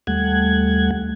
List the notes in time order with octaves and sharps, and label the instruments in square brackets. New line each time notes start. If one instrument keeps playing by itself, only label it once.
[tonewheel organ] D#2 G3 A3 F#5 G#6